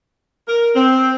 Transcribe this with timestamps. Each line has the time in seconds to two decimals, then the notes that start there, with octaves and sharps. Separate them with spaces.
0.47 A#4
0.75 C4